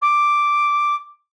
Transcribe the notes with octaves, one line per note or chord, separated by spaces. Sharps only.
D6